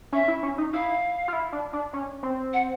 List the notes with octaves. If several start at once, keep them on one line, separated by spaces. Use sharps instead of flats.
C#4 E5
E4
C#4
D#4
E4 F5
F4
E4
D4
D4
C#4
C4
F#5